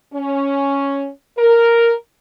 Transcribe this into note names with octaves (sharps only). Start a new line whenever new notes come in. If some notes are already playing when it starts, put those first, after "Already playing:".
C#4
A#4